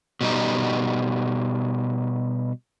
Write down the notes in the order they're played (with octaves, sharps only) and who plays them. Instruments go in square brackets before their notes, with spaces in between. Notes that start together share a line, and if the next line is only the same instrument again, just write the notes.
[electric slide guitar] B2 G3 D#4